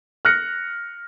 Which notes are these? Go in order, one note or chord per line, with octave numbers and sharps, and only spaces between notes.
F6 F#6 A#6 C#7